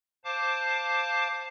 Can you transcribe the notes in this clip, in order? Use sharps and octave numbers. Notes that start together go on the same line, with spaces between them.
C5 F5 A5 D6